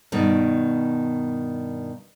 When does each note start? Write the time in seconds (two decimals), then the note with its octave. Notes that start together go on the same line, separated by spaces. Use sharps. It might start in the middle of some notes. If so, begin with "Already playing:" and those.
0.12 G2 B2 D#3